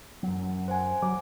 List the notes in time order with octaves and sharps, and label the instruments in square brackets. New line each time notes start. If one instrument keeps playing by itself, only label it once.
[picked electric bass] F#2 F#3
[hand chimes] C5 F#5 G#5
[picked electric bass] F#3 [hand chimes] D6